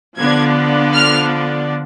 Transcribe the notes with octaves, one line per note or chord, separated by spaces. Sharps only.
D3 F3 B3 D4 G#6
F6